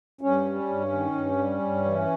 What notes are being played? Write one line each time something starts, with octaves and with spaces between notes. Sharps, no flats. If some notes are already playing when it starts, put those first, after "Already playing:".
G2 C#4
G3
G2
D#3
G2
G3
G2
E3